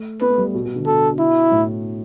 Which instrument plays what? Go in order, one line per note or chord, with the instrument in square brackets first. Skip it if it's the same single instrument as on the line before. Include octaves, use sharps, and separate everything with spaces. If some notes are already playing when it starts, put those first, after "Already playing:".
Already playing: [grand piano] A3
[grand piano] B3 [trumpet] B4
[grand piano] A3
G3
B2
B2
D3
[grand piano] B2 [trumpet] A4
[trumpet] E4
[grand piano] A2